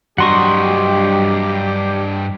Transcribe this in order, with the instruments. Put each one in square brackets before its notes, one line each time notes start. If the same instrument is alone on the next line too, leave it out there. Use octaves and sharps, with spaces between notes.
[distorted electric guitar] G2 D#5 [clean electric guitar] F#3 G3 [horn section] G4 [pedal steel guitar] F#5 C6 C#6